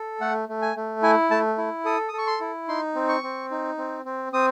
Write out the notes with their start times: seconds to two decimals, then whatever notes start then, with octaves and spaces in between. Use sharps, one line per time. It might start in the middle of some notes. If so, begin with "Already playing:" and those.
Already playing: A4
0.21 A3 F#5
0.49 A3
0.62 G#5
0.76 A3
1.03 E4 G#5
1.31 A3 A5
1.58 E4
1.85 A4 D#6
2.09 D#6
2.13 A4 C#6
2.27 C6
2.40 E4
2.68 D#4 C6
2.95 C4
3.09 C#6
3.23 C4
3.51 D#4
3.78 C4
4.05 C4
4.32 C4 D#6